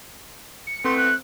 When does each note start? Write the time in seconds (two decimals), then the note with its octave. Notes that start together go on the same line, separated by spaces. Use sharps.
0.67 C#7
0.85 A3 B3 C4 E4 C6
0.98 F#6